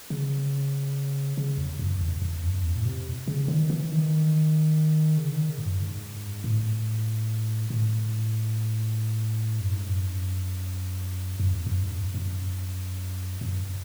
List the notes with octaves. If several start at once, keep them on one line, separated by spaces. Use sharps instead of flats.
C#3
C#3
E2
F#2
E2
E2
F#2
E2
A2
C3
C#3
D#3
E3
D#3
C#3
D#3
C#3
G#2
F#2
G#2
A2
A2
F#2
G#2
F#2
F#2
E2
F#2
G#2
F#2
F#2
F#2